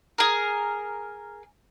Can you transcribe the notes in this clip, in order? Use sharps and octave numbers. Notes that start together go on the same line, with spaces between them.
G#4 A#4